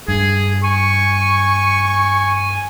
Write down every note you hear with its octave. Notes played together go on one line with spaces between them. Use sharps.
G2 G#4
G#5 C#6